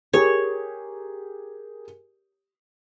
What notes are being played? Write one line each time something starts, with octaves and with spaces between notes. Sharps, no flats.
G4 G#4 A#4 C#5